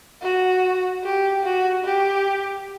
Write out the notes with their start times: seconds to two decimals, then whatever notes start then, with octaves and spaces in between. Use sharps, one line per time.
0.22 F#4
1.04 G4
1.44 F#4
1.85 G4